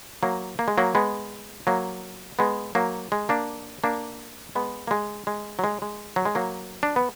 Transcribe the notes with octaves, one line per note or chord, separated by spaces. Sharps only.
F#3 A#3
A#3
G#3
F#3 A#3
G#3 B3
F#3 A#3
G#3 B3
F#3 A#3
G#3
A#3 D4
A#3 D4
G#3 B3
A#3
G#3
G#3
F#3
G#3
G#3
F#3
G#3
F#3 A#3
D4
B3